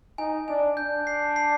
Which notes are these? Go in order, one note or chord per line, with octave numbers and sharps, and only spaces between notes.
D#4 G#5
D4 G#5
D4 G6
C7
C7